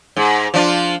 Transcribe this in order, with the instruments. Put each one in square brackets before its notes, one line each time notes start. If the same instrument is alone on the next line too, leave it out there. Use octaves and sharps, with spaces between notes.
[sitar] G#2
F3 D4 F4